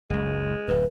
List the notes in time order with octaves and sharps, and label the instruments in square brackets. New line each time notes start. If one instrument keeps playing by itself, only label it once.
[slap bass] F#1 C#2 [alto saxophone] G#3
[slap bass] D1 F#2 [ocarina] B4